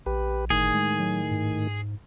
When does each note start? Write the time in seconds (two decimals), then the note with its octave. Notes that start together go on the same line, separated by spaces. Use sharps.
0.06 A#1 G4 B4
0.50 G1 A2 D#3 G#4
0.75 G#3
0.99 F#3
1.31 G#2